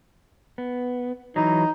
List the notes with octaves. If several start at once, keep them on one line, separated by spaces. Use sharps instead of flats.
B3
E3 F#3 D#4